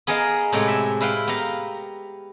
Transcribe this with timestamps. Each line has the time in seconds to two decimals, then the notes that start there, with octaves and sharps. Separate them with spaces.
0.07 B3 G#4 A#4 D#5 F5
0.52 A2 C3 G#3
0.68 E5
1.01 E4 B4 F5 G5
1.27 B3 G4 F5 A#5